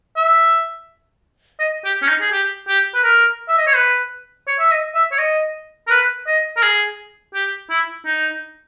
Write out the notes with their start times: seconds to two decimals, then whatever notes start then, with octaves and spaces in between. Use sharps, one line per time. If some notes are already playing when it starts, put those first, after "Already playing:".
0.16 E5
1.60 D#5
1.85 G4
2.02 C#4
2.08 D#4
2.21 G#4
2.32 G4
2.68 G4
2.95 B4
3.04 A#4
3.49 E5
3.58 D#5
3.67 C#5
3.75 B4
4.48 C#5
4.60 E5
4.71 D#5
4.95 E5
5.12 C#5
5.18 D#5
5.87 A#4
5.90 B4
6.27 D#5
6.57 A#4
6.62 G#4
7.34 G4
7.70 E4
8.06 D#4